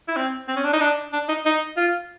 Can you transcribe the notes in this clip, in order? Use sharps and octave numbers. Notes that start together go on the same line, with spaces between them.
E4
C4
C4
C#4
D4
D#4
D4
D4
D#4
D#4
F4